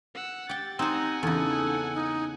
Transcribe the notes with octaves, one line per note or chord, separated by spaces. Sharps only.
F#5 E6
G4 G5 A6
C4 D#4 C5 F#5 G#5 A#5
E2 C#3 D#4 A4
D#4